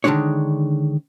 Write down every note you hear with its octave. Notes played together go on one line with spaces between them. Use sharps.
D3 D#3 F#3 G#3 D4 C#5